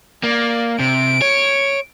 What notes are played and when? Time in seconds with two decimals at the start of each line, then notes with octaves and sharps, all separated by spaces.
0.23 A#3 D5
0.79 C3 D7
1.22 C#5